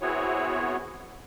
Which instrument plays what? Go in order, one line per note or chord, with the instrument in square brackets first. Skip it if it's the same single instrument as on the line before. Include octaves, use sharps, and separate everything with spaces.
[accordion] B3 C4 E4 F#4 G#4 C#5